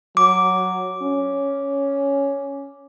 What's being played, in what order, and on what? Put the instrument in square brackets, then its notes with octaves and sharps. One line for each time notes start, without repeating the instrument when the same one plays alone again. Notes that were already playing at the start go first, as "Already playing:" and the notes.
[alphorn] F#3 [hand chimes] D6
[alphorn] C#4